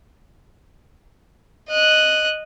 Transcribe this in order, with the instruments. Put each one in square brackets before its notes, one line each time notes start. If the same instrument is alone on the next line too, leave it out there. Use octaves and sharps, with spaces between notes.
[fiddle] D#5 F#6